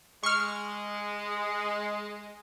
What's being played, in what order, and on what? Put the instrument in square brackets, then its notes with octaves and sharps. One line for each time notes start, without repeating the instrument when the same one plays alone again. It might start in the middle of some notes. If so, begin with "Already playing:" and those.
[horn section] G#3 [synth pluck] C#6 F6